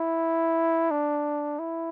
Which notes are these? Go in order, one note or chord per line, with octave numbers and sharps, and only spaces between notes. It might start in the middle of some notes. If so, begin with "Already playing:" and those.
Already playing: E4
D4
E4